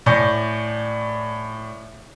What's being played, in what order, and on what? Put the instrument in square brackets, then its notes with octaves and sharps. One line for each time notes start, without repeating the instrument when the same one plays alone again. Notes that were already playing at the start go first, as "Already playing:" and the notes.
[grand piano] A2 D5 G#5 C#6 G6 A#6